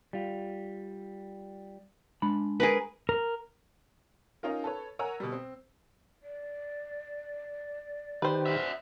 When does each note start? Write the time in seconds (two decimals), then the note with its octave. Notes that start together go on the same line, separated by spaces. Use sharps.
0.13 G3 F4
2.22 G#3 D4 B5
2.60 G#4 A#4 B4
3.09 A#4
4.43 C#4 D#4 F4 A#4
4.64 A4 B4 C#5
4.99 A#4 C#5 F#5 G#5 A#5 E6
5.20 B2 G3
5.32 C4
6.23 D5
8.22 D#3 G4 B4 C5
8.46 F#4 E5